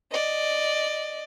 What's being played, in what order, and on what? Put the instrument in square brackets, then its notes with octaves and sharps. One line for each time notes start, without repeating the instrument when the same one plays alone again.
[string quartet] D5 D#5